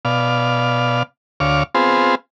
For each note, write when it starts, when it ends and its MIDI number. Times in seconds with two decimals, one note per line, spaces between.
0.05 1.03 47
0.05 1.03 74
0.05 1.03 77
1.40 1.63 38
1.40 1.63 73
1.40 1.63 77
1.40 1.63 86
1.75 2.15 59
1.75 2.15 60
1.75 2.15 65
1.75 2.15 68
1.75 2.15 72